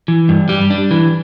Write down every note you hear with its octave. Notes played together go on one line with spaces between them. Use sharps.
E3
G2
G3
D4
E3